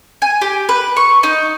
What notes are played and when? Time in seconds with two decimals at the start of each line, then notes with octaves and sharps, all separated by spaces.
0.22 G#5
0.42 G4
0.69 B4
0.97 C#6
1.23 D#4